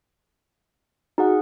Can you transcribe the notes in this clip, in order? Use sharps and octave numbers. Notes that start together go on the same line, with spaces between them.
D#4 F#4 G#4 F#5